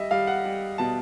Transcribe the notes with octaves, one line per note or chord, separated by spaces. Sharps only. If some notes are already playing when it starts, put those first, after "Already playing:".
Already playing: G3 D#5 E5
G3 F5
F#5
G3
B2 A5